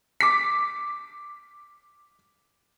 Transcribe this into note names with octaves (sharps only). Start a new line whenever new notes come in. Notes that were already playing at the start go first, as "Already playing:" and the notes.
D6 B6